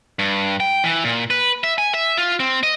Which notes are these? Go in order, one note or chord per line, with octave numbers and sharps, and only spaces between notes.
G2
G5
E3
A#2
B4
E5
G#5
E5
F4
C4
D#5